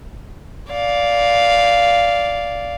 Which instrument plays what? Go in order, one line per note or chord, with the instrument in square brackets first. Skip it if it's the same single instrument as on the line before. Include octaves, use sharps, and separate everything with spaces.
[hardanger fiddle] D5 F5